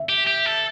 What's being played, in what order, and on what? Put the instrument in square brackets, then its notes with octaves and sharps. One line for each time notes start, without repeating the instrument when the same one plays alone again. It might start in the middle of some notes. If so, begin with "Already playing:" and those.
Already playing: [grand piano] E5
[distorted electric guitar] G4
G4
A4